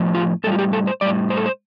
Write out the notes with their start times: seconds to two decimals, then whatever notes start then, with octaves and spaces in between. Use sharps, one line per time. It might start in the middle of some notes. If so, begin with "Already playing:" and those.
Already playing: A2 F3
0.15 F4
0.44 A2 A4
0.47 G3 F4
0.59 G4
0.73 A4
0.87 C5
1.01 A2 G3 D5
1.30 C5
1.37 A4
1.46 C5